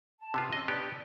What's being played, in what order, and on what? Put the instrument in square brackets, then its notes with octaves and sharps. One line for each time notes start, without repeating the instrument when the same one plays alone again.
[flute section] A5
[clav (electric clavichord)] C3 B3 F4
[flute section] C#4 E6 [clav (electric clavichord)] D#5
[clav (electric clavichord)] B3 D4 G4 [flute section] D5